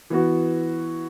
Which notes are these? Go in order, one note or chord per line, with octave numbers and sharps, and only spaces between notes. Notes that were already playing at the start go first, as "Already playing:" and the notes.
E3 B3 F#4